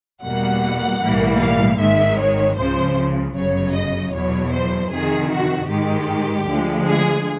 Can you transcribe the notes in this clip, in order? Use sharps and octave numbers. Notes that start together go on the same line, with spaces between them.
E2 B2 G3 A#3 F#5
B1 A2 E3 G3 A#3
F5
G#1 G#2 D#3 G#3 E5
C#5
C#2 C#3 F3 C5
G1 F#2 C#3 F#3 C#5
D#5
E2 B2 F#3 C#5
C5
F2 C3 D#3 G#4
F#4
G#2 D#3 G#3 G4
D2 D3 F3 G#3
G#4